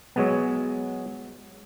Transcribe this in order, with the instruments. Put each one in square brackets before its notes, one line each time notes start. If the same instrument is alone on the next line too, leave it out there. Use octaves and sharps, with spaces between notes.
[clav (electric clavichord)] F#3 G#3 B3